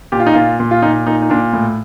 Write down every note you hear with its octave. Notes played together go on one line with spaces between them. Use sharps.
A#2 G4
F4
D#4
A#2 F4
A#2
F4
A#2 D#4
A#2 D#4
D#4
A#2 D4
A2